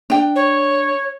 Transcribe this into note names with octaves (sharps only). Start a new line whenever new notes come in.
D4 G5
C#5